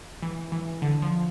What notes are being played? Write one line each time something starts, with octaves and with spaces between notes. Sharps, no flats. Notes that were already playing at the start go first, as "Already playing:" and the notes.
E3
E3
D3
F3